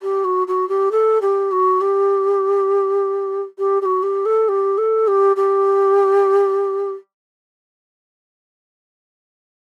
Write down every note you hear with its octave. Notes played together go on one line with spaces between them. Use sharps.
G4
F#4
F#4
G4
A4
G4
F#4
G4
G4
G4
F#4
G4
A4
G4
A4
G4
G4